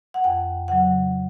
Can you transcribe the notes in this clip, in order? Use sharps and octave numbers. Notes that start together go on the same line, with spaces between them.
F#5
F2 G5
C#3 F#3 F#5